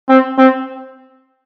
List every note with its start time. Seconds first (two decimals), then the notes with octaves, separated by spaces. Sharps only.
0.09 C4
0.38 C4